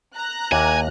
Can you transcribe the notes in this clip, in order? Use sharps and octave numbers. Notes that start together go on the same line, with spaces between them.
A#5 F#6
D#2 A#3 E4 G#5